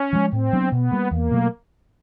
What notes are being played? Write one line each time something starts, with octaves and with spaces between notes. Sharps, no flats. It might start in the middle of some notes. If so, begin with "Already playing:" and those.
Already playing: C#4
F3 G#3
A2 C4
F#3 B3 D4
B2 B3
G3 A#3
E2 A#3
B2 F#3 A3